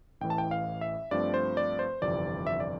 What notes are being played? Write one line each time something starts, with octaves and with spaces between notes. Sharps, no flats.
A1 A2 E3 G5
A5
G5
F5
E5
G2 F3 A3 C4 D5
C5
D5
C5
G1 F2 C3 E3 D5
E5
D5